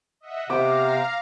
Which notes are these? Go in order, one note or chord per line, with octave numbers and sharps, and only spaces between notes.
D#5 E5 F#5
C3 B3 C5 F5 G5 A#5 D6